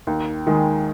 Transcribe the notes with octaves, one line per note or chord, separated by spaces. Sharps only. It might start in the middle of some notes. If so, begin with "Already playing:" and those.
D#2
D#3 G#3